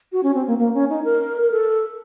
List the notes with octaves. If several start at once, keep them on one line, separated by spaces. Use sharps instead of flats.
F#4
C#4
C4
A#3
A#3
C#4
D#4
A#4
A#4
A4